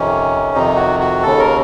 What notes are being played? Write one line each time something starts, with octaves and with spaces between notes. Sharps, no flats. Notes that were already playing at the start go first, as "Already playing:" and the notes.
Already playing: F2 C3 D#3 C#4
F2 C3 D#3 D#4
F#4
F#4
D#2 C#3 A4
A#4